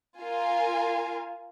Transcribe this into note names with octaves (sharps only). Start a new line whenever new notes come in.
F4 A#4 F5 G#5